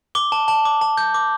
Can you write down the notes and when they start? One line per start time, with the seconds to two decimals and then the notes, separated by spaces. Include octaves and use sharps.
0.15 D6 G7
0.32 A5
0.48 A5
0.65 D6
0.81 A5
0.97 G6
1.14 D6